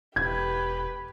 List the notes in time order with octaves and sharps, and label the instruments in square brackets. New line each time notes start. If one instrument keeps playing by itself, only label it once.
[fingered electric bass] E1 [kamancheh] G4 B4 [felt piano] G#6